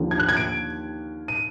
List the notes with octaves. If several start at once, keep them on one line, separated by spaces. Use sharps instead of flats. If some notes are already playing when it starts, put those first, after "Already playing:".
Already playing: D#2 D3 F3
G#6
F#6
G#6
D7
D#7